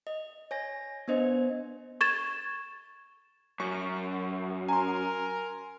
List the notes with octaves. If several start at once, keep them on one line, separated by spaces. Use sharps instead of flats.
D#5
C#5 G#5 A#6
B3 D4 C5 D#5
C#6 G#6 A6 E7
F#2 C#6
A#4 G#5 A#5 C6